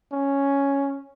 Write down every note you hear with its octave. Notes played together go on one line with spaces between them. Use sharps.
C#4